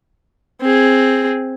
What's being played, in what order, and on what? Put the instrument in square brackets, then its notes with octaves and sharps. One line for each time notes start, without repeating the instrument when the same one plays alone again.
[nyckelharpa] C4 G#4